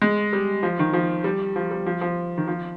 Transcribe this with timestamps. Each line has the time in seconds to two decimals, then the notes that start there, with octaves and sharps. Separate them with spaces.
0.02 G#3
0.33 G3
0.63 F3
0.79 D#3
0.93 F3
1.24 G3
1.56 F3
1.71 G3
1.86 F3
2.01 F3
2.38 D#3
2.48 F3